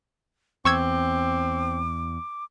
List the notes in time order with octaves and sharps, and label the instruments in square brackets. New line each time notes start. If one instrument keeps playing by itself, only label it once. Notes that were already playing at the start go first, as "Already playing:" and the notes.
[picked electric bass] E2 [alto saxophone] C4 [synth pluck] C#6 E6 G#6 [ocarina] D6